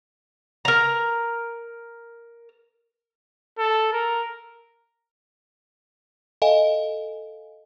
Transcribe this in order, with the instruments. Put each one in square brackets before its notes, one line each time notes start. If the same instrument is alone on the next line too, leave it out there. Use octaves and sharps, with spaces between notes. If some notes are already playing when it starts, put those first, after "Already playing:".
[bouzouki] A#4 A#5
[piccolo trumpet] A4
A#4
[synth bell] A4 D#5 F5 G#5